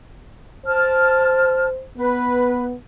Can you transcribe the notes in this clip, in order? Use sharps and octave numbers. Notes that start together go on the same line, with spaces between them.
C5 A5 F6
B3 B4